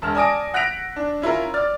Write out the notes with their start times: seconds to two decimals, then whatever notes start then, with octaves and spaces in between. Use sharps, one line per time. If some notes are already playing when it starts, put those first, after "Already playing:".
0.02 E1 A5 F6
0.15 D5 G#5 A5 D#6 A#6 D7
0.54 F#5 F#6 A#6 B6 D7 F7
0.96 D4
1.22 C#4 E4 F4 A#4
1.54 D5 F6 A6